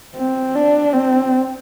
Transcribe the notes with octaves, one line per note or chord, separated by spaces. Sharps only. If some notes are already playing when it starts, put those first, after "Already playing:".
C4
D4
C4